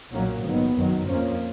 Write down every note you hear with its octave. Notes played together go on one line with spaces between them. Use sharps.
B1 A#2 F#3 A#3 C#4
A#1 G#2 D#3 F#3 B3
F#2 D#3 F#3
F2 F3 A#3 C#4